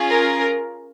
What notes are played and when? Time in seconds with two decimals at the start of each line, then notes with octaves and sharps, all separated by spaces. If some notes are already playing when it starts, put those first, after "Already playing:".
Already playing: C#4 F4 G#4
0.10 A#4